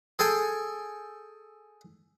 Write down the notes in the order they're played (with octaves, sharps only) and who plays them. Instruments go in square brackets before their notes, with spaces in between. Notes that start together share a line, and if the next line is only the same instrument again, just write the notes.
[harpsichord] G#4 A4 G5 G#5